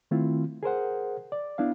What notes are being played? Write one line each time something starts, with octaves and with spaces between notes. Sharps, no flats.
D#3 A3 C4 E4 F4
G#4 A#4 C5 F#5
D5
B3 D4 E4 F5